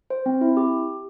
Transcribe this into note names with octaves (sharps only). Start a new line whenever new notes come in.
C5
C4
E4
G4